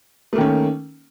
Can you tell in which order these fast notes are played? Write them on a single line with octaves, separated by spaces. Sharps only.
A3 A#3 D#3 C#4